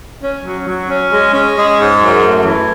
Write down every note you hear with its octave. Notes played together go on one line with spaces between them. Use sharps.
C#4
F#3
F#3
C#4
G#3
C#4
G#3
G#2
F#2
A3
E3